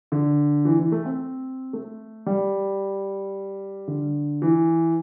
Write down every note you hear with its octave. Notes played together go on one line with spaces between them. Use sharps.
D3
E3
E3
A3
C4
A3
G3
D3
E3